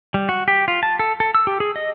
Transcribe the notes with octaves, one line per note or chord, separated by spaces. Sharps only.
G3
F#4
G4
F4
A5
A4
A4
E6
G4
G#4
D#5